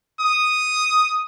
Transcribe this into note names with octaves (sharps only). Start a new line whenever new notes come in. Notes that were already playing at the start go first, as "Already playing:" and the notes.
D#6